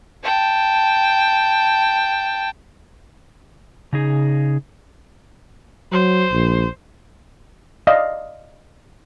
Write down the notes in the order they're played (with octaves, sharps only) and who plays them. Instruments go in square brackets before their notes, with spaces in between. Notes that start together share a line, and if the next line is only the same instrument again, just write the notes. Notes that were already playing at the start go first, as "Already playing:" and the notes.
[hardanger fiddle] G5 A5
[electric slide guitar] C#3 D#4 G#4
[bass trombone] F#3 [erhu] C5
[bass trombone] A#1
[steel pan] D5 D#5 F5